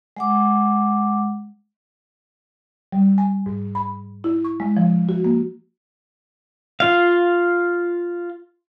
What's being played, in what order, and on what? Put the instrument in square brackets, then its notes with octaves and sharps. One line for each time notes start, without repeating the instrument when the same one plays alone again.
[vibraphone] G#3 F#5 D6
[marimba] G3
G#5
G#2
B5
E4
C#6
G#3
F3
F#4
A#3
[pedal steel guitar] F4 F5